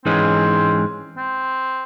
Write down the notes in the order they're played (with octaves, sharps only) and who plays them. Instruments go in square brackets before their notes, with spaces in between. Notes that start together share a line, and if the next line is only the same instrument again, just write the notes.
[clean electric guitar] G#2 E3 G#3 C#4 [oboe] C4
[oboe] C4